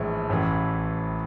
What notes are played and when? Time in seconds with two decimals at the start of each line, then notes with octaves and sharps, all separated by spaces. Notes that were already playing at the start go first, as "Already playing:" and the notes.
Already playing: A#1 A2 E3 G#3
0.29 A1 A2 E3